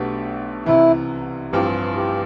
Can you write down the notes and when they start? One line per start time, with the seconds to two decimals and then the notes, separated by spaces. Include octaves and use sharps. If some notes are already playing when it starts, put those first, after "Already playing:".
Already playing: B1 B2 A3 D4 G4
0.66 C2 C3 E3 E4
1.53 A1 G2 F3 C4 F4 G4
1.96 G4